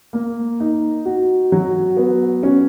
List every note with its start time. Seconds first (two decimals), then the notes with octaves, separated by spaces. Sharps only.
0.13 A#3
0.60 D#4
1.05 F#4
1.52 F#3
1.97 B3
2.43 C#4